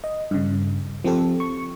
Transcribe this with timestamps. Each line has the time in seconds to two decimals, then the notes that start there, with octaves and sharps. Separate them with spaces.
0.04 D#5
0.31 G2 C#3
1.04 F3 C4 G4 A4
1.40 C#6